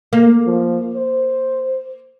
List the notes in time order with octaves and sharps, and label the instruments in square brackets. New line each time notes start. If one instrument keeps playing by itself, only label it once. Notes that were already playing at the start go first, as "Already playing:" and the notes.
[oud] A#3
[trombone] F3
C5